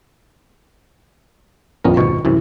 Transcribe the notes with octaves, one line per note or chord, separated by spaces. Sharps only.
A#1 F2 B3 C#4 A#4
D#2 G#2 B2 C#6
C2 F#2 C3 E3